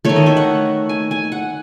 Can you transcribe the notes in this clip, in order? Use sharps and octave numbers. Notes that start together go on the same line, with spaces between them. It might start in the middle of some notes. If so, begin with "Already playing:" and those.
D#3 A3 C#5
D#5
E5
F#5
G#5
G#5
F#5